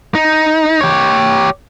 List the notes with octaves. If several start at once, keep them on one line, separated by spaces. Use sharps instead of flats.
D#4
G4 C#5